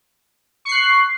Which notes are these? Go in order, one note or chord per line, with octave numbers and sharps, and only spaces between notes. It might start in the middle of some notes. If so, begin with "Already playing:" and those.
C#6 F#6 C7